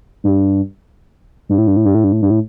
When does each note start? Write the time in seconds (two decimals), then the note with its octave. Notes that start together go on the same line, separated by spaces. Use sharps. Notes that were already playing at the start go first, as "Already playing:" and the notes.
0.24 G2
1.49 G2
1.58 A2
1.67 G2
1.77 A2
1.85 G2
1.95 A2
2.04 G2
2.12 A2
2.22 G2
2.30 A2